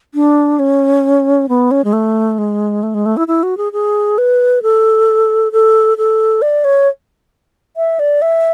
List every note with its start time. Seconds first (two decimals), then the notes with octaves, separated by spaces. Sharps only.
0.14 D4
0.59 C#4
1.49 B3
1.71 C#4
1.84 G#3
1.93 A3
2.38 G#3
2.83 A3
2.94 G#3
3.06 A3
3.17 E4
3.28 E4
3.43 F#4
3.57 G#4
3.73 G#4
4.18 B4
4.63 A4
5.52 A4
5.98 A4
6.42 D5
6.64 C#5
7.77 E5
7.99 D5
8.22 E5